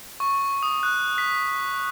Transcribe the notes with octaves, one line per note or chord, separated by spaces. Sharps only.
C#6
D#6
F#6
B6